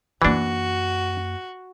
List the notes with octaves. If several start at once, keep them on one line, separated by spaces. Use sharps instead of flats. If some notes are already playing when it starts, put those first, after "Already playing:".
F#2 E3 A#3 D4 F#4